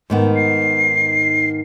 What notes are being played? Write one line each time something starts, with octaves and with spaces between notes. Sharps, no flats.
G#2 D#3 B3
C7